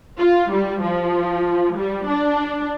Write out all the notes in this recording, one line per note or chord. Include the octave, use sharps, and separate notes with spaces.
F4
G3
F3
G3
D4